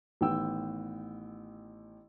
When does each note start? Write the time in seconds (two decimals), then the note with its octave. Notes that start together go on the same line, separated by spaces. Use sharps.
0.21 A1 D#3 B3 G5 E6